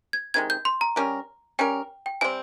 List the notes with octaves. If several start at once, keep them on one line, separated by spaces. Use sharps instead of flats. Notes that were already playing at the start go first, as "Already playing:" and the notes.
G#6
C3 D#3 G#3 G#6
G6
C6
A#5
G3 C#4 G4 A#4
G3 C#4 G4 A#4 G5
G5
C3 G3 C4 G#5